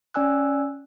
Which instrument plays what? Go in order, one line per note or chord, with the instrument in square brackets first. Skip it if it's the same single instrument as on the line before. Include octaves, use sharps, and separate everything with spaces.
[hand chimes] C#4 D5 G#5 E6 F#6